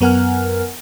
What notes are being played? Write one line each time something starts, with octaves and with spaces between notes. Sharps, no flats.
F#2 B3 A#4 F#5 G#5 F6